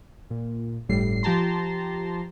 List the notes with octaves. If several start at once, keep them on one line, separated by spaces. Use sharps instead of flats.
A#2
G1 A2 G3 C7
F3 G4 A5 A#5 C6